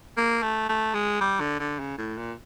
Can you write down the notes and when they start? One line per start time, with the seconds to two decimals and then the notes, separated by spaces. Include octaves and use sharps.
0.17 A#3
0.42 A3
0.69 A3
0.94 G#3
1.21 G3
1.40 D3
1.59 D3
1.79 C#3
1.98 A2
2.17 A#2